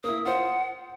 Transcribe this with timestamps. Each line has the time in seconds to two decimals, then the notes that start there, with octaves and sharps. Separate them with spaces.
0.04 A#3 E4 D#6
0.25 F4 C5 F#5